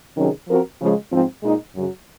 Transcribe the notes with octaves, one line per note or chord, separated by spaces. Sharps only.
C3 D#3 F#3 C#4 G#4
F3 C4 F#4 A#4
C#3 F3 G#3
G#2 F3 C4
A#2 G#3 D#4
F#2 C#3 F#3